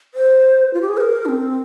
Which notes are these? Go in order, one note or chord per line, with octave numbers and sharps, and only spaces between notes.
C5
F4
G4
G#4
C5
A#4
D4
C4